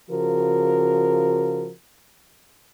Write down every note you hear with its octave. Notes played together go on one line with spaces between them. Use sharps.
C#3 F3 F#4 A#4